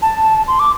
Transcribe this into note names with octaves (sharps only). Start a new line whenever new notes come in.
A5
C6
D6